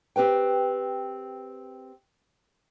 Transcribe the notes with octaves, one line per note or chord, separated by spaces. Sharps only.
C4 G4 B4 G5